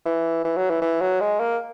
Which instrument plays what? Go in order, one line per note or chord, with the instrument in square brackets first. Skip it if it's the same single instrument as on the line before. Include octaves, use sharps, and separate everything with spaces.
[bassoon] E3
E3
F#3
E3
E3
F#3
G#3
A#3